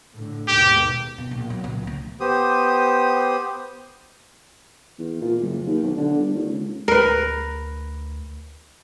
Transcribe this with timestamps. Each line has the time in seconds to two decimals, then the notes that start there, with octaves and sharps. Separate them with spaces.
0.14 A2 D3
0.48 D#2 G#2 B2 G4
1.18 B2
1.31 A#1
1.50 F#3
1.64 C#2 A#2
1.83 D3 A3
2.20 B3 G4 C5 D#6
4.99 E2
5.21 A#2
5.41 F#1
5.66 D#2
5.82 B1
5.97 D3
6.18 G1
6.34 D#2
6.47 C#2
6.88 D2 A#4 B4